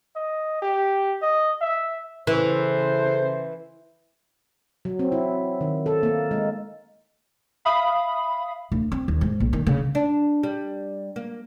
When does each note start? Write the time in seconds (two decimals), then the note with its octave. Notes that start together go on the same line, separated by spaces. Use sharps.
0.16 D#5
0.62 G4
1.22 D#5
1.61 E5
2.27 C#3 E3 A4 C5
4.85 F#3
4.99 C4
5.12 E4
5.61 D#3
5.86 A4
6.03 A#3
6.31 G#3
7.65 E5 F5 B5 D#6
8.72 D2
8.92 C4
9.08 D#2
9.21 G#2
9.40 A#1
9.53 D#3
9.67 C#3
9.95 D4
10.43 G3
11.16 A#3